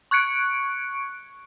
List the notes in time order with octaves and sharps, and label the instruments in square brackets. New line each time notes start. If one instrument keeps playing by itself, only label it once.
[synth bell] C#6 F#6 G#6 C#7 D7